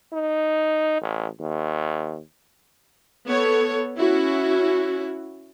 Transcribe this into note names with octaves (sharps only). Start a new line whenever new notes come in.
D#4
A1
D#2
B3 A4 C#5
C#4 E4 F#4